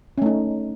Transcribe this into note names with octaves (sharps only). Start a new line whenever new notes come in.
A3 C#4 D#4